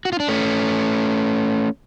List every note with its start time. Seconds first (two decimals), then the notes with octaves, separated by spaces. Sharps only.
0.05 F#4
0.13 F4
0.20 D4
0.28 A3 C#4